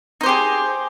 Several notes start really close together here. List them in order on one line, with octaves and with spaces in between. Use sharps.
D#4 C5 G4 G#4